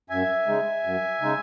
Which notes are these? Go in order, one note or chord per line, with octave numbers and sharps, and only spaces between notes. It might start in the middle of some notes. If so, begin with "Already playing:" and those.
F#2 E5 G#5
C#3 G#3 D#4
F#2
C#3 G#3 D#4